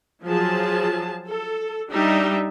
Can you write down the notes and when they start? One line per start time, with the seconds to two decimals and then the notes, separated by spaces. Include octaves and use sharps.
0.25 F3 F#3 G#4 A5
1.28 A4
1.90 G3 D4 D#4 G4 E5